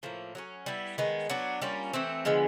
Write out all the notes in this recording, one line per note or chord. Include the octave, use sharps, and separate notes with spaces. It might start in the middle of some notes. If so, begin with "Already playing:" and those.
A2 F3 A#3
F#3 A#3 C#4
G3 B3 E4
D#3 G#3 B3
F#3 B3 D4
G3 A#3 C#4 F4
E3 A3 C4
D3 F3 G#3 B3